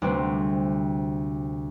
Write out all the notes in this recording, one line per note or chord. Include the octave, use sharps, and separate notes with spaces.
D2 C3 G3 C4